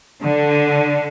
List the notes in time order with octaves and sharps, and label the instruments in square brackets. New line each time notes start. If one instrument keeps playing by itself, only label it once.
[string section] D3